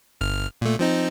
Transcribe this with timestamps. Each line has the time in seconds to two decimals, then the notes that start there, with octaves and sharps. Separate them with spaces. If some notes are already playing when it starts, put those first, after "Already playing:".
0.21 G1 F6
0.61 A#2 A3
0.79 F3 C4 D#4